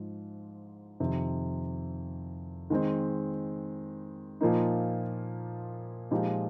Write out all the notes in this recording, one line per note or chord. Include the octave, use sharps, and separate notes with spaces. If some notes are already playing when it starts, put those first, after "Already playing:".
Already playing: G#2 F3
F2 C3 D#3
D#3 G#3 C4
A#2 F3 A#3 D#4
A#2 F3 G#3 D#4 G4